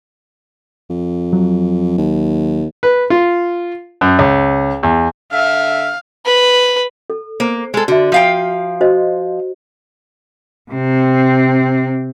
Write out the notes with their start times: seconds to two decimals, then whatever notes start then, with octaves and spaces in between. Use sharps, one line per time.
0.90 F2
1.33 F#3
1.98 D#2
2.83 B4
3.10 F4
4.01 F#2
4.19 C#2
4.83 E2
5.32 D3 E5 F5
6.26 B4
7.10 A4
7.40 A#3 C5
7.74 G#3 A4
7.88 D3 F#4 E5
8.12 F3 F5 G5
8.81 F#4 C5 D#5
10.71 C3 C4